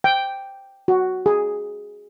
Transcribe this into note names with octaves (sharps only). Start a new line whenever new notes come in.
G5
F#4
G#4